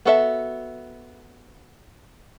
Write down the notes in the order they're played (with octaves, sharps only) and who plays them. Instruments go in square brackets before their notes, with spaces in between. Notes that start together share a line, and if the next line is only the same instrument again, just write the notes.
[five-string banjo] B3 F#4 A4 D5 E5